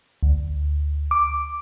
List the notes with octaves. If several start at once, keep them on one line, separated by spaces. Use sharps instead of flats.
D2
D6